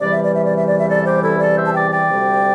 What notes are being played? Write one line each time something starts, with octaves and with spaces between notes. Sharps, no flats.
E2 C3 E3 G3 D5
E5
D5
E5
D5
E5
D5
E5
A4 D5
G4 C5
E4 A4
A4 D5
C5 E5
A5
D5 G5
D5 G5
D2 C3 G3